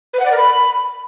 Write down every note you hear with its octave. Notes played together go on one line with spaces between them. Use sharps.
B4
F#5
D5
A#4
B5